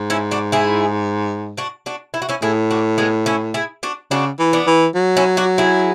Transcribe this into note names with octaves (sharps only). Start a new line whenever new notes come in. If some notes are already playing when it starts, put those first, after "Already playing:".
Already playing: G#2
C#4 E4
D4 F#4
E4 G#4
D4 F#4
D4 F#4
E4
F#4
C#4 E4
A2 E4 G#4
D4 F#4
G#3 B3
C#4 E4
E4 G#4
D4 F#4
C#3 D4 F#4
E3
B3 D4
E3
F#3
C#4 E4
D4 F#4
E4 G#4